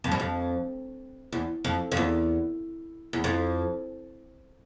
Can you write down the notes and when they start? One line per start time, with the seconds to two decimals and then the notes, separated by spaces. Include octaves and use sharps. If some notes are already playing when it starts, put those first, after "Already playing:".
0.04 F2
0.12 G2
0.20 F2
1.32 E2
1.64 F2
1.92 F2
1.97 E2
3.13 E2
3.24 F2